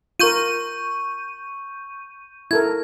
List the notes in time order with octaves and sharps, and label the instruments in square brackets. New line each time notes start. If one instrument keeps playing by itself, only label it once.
[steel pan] F4 A#4 [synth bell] C#6 G6 D#7
[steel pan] E4 A4 A#4 [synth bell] G#6